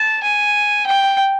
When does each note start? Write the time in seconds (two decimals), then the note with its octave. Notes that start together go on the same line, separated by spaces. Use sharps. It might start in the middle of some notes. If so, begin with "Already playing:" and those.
Already playing: A5
0.23 G#5
0.86 G5